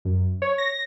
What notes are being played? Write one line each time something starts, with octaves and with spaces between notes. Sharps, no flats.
F#2
C#5
A#6